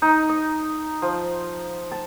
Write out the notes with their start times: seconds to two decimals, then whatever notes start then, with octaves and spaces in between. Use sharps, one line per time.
0.02 D#4
0.29 D#5
1.02 F3
1.92 A5